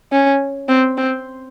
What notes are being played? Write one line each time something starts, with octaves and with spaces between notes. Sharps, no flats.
C#4
C4
C4